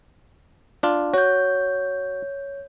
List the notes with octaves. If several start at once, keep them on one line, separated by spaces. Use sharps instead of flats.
D4 F4
F#4 C#5 G6